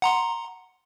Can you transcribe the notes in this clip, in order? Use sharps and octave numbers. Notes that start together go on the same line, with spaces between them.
F#5 A#5 C6